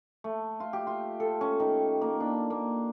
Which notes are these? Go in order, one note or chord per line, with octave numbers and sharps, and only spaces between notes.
A3
F4
G4
F4
A4
C#4
D#3
A#3
D4
A#3